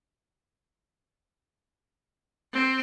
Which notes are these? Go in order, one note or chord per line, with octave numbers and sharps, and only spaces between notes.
C4